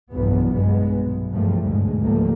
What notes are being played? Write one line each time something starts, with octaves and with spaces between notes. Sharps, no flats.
F1 B1 E2 G2 F#3 B3
A#1 G2 B2 G#3 B3
B1
E2 G2 F3 G3 A3 A#3
D2 G#2 B2 G#3
C#2 G#2 F3 G3 A3 A#3